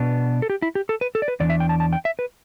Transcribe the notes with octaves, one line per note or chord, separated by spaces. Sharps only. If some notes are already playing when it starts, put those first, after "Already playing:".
Already playing: B2 B3 D4
A4
G4
E4
G4
A4
B4
A4
D5
B4
E2 E3 D4 D5
E5
G5
A5
A5
G5
E5
B4